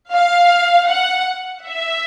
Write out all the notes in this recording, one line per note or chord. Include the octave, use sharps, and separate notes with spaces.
F5
F#5
E5